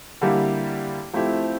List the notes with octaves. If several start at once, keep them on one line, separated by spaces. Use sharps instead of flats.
D3 G3 A#3 E4 G4
F3 A3 C4 E4 G4